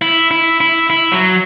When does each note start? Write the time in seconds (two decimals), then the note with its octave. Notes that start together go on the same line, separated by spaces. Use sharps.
0.02 E4
0.31 E4
0.61 E4
0.90 E4
1.12 F#3